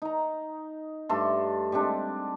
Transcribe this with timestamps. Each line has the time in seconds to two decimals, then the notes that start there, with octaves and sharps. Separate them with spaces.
0.02 D#4 A#5
1.09 G2 A3 A4 C6
1.72 G3 G#3 C4 D4